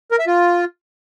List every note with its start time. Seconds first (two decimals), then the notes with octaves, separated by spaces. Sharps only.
0.11 A#4
0.19 E5
0.27 F4